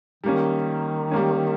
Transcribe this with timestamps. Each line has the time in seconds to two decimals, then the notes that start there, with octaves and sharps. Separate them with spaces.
0.23 D#3 G3 A#3 C#4
1.11 G3 A#3 C#4